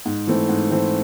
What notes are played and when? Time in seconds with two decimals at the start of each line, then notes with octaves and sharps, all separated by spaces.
0.06 G#2
0.27 E3 A3 C4
0.49 G#2
0.71 E3 A3 C4